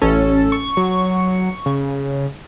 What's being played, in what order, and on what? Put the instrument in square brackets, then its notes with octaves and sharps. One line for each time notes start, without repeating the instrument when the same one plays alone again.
[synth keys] A1 C#4 [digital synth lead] A4
[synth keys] C#6
[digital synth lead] F#3
C#3